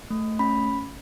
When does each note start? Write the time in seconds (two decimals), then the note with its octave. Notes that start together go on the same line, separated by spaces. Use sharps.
0.10 A3
0.39 C#4 B5